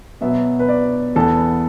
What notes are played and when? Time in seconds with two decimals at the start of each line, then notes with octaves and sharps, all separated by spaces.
0.21 B2 F#3 B3 E5
0.59 B4
0.69 D5
1.16 E2 E3 B3 A4